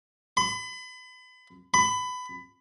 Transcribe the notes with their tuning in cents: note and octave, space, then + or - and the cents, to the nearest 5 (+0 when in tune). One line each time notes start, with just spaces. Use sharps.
B5 +35
B5 +20